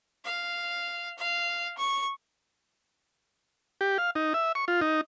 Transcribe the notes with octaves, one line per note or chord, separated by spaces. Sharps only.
F5
F5
C#6
G4
F5
D#4
E5
C#6
F4
D#4